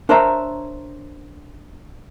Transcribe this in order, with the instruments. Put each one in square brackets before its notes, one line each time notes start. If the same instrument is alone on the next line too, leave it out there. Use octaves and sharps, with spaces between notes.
[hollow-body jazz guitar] D4 A#4 C5 C#5 E5 A#5